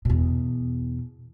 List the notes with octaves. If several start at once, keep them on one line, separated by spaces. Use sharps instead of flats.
E2 B2